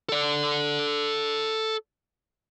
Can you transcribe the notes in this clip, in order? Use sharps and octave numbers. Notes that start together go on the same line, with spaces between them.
A4 D5